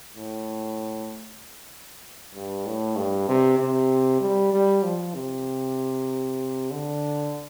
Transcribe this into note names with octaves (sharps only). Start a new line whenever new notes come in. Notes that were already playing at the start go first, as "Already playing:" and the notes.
A2
G2
A2
G2
C3
C3
G3
G3
F3
C3
D3